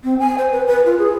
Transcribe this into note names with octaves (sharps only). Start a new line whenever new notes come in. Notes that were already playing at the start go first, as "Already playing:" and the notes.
C4
G#5
C5
B4
B4
F4
G#4